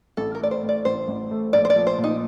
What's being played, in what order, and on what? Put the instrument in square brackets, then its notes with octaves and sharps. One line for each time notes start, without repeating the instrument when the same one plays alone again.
[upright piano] A1 [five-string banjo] A4
[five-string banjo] A#4
[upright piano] A3 [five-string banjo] D5
[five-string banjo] C5
[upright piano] A2
[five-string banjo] D5
[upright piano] A1 [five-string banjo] C5
[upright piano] A1
A3
[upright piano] A#1 [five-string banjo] D5
[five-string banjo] C5
D5
[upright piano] F3
[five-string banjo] C5
[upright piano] A#2
[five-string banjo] D#4